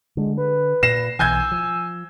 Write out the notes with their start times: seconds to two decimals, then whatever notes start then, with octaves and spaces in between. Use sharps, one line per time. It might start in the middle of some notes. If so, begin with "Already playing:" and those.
0.17 D3 G#3
0.38 B4
0.83 A#2 A#6 C7 E7
1.19 B1 B2 E3 G#5 E6 G6 G#6
1.51 F3